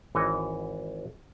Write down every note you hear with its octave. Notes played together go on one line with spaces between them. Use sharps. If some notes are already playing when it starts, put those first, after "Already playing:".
G#1 E3 F#4 C#5 D#5